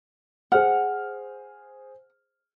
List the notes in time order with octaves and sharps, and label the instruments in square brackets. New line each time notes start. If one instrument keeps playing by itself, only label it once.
[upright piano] G#4 C5 F6 [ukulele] F#5